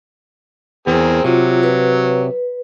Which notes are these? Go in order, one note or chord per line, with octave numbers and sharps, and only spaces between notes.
E2 C4 G#4 A#4
C3 F#3 F4
B4